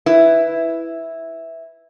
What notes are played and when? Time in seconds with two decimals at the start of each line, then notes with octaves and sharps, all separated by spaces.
0.06 E4 B4